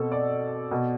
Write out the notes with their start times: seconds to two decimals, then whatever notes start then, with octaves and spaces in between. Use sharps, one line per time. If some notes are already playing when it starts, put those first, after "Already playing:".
Already playing: B2 C4 A4
0.12 D5
0.71 B2